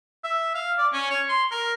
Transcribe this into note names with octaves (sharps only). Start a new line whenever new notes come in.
E5
F5
D5
C#4
C#5
C6
A#4